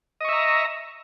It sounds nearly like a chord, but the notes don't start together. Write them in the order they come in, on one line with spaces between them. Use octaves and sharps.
D#5 C#6 E5 A#5